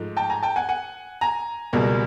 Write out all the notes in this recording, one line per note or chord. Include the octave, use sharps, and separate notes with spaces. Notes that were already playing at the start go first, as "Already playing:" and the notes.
Already playing: G#2 F3 A3
G5 A5
G#5 A#5
G5 A5
F#5 G#5
F#5 G#5
G#5 A#5
C#2 B2 G3 A#3